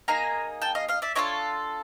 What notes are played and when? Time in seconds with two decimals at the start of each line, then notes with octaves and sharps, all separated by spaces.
0.08 A#3 D#4 G#4 G#5 A#5
0.61 G5 A5
0.75 D#5 F5
0.89 D#5 F5
1.02 D5 E5
1.15 D4 F4 A4 C#5 D#5